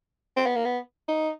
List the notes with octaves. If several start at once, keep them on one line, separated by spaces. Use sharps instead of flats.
C4
B3
A#3
B3
D#4